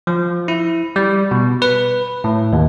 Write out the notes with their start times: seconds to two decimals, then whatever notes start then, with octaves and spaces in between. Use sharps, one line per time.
0.07 F3
0.48 E4
0.96 G3
1.31 B2
1.62 B4
2.24 A2
2.53 D#2